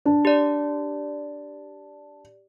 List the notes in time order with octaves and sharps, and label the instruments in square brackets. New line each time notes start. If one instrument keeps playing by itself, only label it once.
[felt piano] D4
[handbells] G4 D5